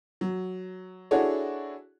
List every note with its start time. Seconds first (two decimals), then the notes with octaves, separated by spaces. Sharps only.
0.21 F#3
1.11 D4 E4 F#4 G#4 A4 C#5